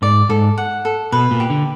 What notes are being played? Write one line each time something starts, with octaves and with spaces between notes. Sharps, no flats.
G#2 D5
G#2 A4
F#5
A4
B2 B4
A#2
G4
D3